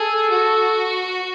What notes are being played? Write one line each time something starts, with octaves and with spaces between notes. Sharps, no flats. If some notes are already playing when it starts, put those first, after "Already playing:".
Already playing: G#4 A4
F#4